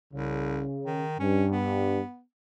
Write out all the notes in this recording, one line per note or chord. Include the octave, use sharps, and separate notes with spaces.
C2 C#3
D#3
G2 C#4
B3